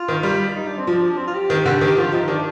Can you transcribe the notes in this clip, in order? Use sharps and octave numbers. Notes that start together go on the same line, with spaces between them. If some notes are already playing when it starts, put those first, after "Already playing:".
Already playing: F4
D#3
G3
D#4
D4
C4
F3 D4
C4
F4
G4
D#3
D3
D#3
G4
F3 F4
F3 D#4
D#3 D4